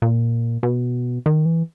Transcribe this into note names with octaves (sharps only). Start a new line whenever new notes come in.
A#2
B2
D#3
E3